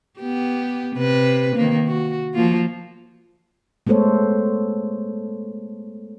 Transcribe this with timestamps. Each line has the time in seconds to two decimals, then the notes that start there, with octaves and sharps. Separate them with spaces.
0.20 B3 G4
0.96 C3 B4
1.56 D#3 A#3
1.87 F#4
2.34 F3 A#3 F4
3.87 G#3 A3 B3 A4 C5 C#5